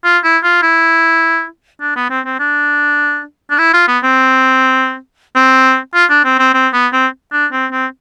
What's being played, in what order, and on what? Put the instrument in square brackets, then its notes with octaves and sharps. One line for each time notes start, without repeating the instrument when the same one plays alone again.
[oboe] F4
E4
F4
E4
D4
B3
C4
C4
D4
D4
E4
F4
B3
C4
C4
F4
D4
C4
C4
C4
B3
C4
D4
C4
C4